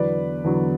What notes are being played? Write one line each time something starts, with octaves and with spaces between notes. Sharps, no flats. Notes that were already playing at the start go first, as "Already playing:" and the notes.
Already playing: E2 D3 F#3 B4 D5
E2 D3 F#3